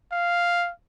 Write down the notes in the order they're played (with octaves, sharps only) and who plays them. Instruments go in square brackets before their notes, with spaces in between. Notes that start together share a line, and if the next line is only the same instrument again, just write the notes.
[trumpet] F5